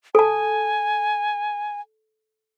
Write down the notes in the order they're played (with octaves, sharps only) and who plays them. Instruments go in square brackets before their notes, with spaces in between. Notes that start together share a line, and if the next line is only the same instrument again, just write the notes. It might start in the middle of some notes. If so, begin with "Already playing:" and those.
[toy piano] A4 A5 [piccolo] G#5